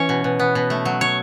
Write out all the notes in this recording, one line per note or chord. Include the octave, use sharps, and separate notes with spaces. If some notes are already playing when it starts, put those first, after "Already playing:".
Already playing: E3 C#4 C#5
B2
B2
B3
B2
A3
F#3
C#5